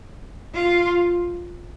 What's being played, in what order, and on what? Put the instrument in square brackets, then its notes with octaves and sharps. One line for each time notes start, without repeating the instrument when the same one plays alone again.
[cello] F4